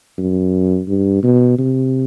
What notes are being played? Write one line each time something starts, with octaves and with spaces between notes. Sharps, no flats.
F#2
G2
B2
C3